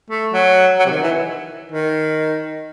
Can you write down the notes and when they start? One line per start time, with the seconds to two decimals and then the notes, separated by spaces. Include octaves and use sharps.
0.10 A3
0.33 F#3
0.79 F#3
0.86 C3
0.91 D#3
1.02 E3
1.72 D#3